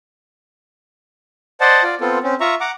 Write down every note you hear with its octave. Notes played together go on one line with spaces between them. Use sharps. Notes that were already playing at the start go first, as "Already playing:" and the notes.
C5 D5 D#5 F#5 A5
F4 D5
B3 C4 F4 A4
C4 C#4
F4 E5 A#5 C#6
F#5 A#5 D6